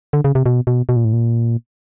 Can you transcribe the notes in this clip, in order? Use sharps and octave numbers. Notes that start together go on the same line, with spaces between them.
D3
C#3
C3
B2
B2
B2
A#2
A2
A#2